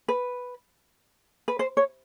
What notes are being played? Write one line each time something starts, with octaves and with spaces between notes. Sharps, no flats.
B4
B4
C5
C#5